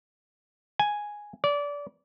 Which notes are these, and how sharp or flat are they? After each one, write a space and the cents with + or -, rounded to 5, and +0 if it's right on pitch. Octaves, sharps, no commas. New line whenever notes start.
G#5 +0
D5 -25